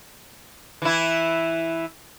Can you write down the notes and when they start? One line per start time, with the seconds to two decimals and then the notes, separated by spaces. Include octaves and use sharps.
0.82 E3 E4